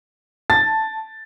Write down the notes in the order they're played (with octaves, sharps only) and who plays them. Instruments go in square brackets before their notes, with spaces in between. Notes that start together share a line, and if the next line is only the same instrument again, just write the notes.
[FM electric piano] A5 [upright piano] A6